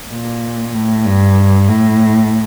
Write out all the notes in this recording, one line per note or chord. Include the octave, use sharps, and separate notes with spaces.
A#2
A2
G2
A2